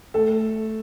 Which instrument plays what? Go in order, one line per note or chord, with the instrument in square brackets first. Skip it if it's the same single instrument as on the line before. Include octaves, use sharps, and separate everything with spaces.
[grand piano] A3 A4